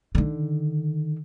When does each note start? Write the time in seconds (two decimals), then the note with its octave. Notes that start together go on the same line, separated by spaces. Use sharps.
0.15 D3 D#3